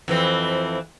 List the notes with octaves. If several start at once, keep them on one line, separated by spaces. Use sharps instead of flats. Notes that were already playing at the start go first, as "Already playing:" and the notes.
F2 E3 C4